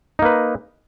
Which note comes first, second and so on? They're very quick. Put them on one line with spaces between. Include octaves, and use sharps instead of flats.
D#4 A#3 B4